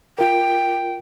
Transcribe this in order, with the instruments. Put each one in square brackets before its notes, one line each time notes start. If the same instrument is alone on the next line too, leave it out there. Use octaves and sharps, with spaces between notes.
[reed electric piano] F4 A#4 [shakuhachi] G5